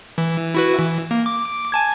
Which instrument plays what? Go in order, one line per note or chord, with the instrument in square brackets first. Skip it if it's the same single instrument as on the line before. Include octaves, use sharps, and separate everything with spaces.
[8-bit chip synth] E3
E4 F#4 B4
E3
A#3
D6
G#5 A5 G#6